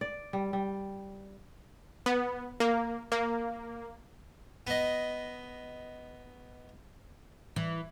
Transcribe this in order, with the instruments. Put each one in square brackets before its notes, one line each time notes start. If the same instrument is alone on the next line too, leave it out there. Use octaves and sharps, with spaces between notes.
[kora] D5
G3
G3
[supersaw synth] B3
A#3
A#3
[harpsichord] B3 D#5
[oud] E3